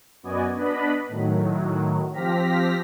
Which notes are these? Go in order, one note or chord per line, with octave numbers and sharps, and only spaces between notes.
F#2 B3 F#4 D5 D#5 G#5
B3 D4 B4 D#5 B5
A2 D#3 F#3
F3 C4 G4 F6 A#6 B6